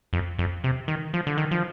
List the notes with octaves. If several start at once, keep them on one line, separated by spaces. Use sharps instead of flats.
F2
F2
C3
D#3
F3
D3
D#3
F3